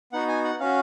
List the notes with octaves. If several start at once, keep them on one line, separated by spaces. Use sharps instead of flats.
B3 D#4 F#4 F#5
G#5
F#5
C#4 F#4 F5